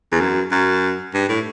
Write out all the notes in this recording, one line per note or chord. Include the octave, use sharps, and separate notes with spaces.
E2
F#2
F#2
G2
A2